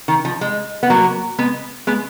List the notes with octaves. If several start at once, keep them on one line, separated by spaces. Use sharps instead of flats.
D#3
F3
G#3
B3
F#3 A#3
G#3 B3
G#3 B3